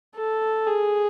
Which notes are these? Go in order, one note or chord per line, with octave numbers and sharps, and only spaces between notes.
A4
G#4